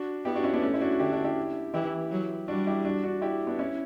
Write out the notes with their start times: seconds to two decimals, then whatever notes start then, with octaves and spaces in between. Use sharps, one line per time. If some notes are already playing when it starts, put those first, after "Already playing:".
Already playing: D4 F#4
0.25 B3 E4 G4
0.35 D4 F#4
0.44 C#4 E4
0.53 B3 D4
0.62 A3 C#4
0.74 E4
0.81 D4 F#4
0.92 F#4
0.99 D3 E4 G4
1.12 D4 F#4
1.24 E4 G4
1.74 E3 E4 G4
2.11 F#3
2.48 G3 D4 F#4
2.67 E4 G4
2.85 D4 F#4
3.04 D4 F#4
3.22 E4 G4
3.47 B3 D4
3.59 C#4 E4